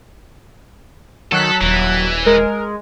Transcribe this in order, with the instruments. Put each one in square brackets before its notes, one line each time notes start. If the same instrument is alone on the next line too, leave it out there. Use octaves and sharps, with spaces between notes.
[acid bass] D#3 [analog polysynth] F#3 F#6 B6 [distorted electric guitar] A4
[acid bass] D#1 [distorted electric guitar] E3
[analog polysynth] G#3 [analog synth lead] A#4